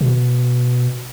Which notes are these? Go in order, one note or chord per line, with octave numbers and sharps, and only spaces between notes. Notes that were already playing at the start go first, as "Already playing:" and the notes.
B2